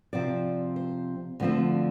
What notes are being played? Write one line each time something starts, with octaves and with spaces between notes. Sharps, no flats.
C3 F3 C4 D5
C5
D2 D3 F3 C4